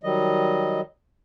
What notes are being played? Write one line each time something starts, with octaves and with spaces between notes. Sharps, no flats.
D#3 F#3 G3 D#5